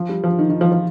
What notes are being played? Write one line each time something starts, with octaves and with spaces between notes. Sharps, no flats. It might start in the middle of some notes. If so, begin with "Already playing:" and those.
Already playing: F3
G3
F3
D#3
D#3
F3
F3